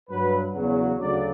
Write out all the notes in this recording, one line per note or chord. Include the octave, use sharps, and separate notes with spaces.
G2 F#3 B4
E2 C#3 F#3
D2 C#3 F#3 D5